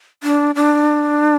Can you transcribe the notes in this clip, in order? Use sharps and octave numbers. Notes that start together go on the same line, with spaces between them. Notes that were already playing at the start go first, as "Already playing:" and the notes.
D4
D4